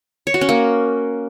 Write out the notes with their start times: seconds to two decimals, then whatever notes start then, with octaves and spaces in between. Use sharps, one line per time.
0.27 C#5
0.34 F#4
0.41 C#4
0.49 A#3